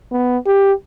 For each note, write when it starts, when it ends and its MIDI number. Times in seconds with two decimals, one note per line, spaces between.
0.12 0.38 59
0.46 0.73 67